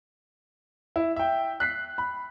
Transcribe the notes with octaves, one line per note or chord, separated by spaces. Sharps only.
E4
E5 G5
F#6 B6 C7
B5